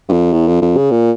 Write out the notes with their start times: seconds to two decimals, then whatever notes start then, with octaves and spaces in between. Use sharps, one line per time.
0.09 G2
0.12 F2
0.33 E2
0.47 F2
0.62 F2
0.77 C#3
0.91 A#2